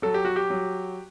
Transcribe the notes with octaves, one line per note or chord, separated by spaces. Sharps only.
F#3 A4
G4
F#4
G4
F#3